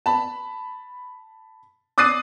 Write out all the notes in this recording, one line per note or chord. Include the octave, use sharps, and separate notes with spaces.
A5 B5
D6 D#6 F#6 A6 C7 D#7